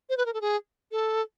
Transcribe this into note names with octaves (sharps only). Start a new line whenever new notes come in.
C5
B4
A#4
A4
G#4
A4